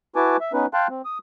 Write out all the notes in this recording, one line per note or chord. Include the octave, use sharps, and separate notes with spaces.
E4 F#4 B4 G#5 A5 D6
E5
B3 C#4 D#4 B4
F5 G5 A5 C6 F#6
C4
D#6